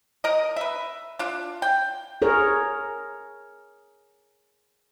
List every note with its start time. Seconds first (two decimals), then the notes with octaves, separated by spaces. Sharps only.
0.24 A#4 D#5
0.56 B4 E5
1.19 D4 F4
1.62 G5
2.22 G#4 A#4 C#5